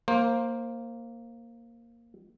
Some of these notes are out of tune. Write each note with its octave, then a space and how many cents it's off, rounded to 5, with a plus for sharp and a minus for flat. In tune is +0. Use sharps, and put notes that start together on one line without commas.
A#3 +0 C5 +20